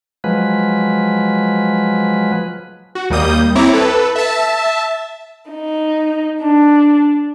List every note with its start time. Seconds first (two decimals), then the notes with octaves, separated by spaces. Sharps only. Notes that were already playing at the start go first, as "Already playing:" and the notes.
0.24 F3 F#3 G#3 B4
2.95 F#4
3.10 D#2 G3 A#3 D#6 G6
3.55 C4 E4 C#5 A#5 D6
3.74 A4 B4
4.15 E5 A5
5.50 D#4
6.41 D4